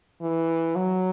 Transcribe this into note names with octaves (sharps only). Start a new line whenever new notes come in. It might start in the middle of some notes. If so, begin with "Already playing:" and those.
E3
F#3